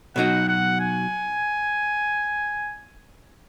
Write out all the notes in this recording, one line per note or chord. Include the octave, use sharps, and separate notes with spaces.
B2 F#3 D#4 F#4 F#5
F#5
G#5